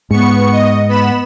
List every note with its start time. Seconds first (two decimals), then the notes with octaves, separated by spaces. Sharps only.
0.10 G#2 B3 C#6 C#7
0.52 D#5
0.89 B3 B5 E7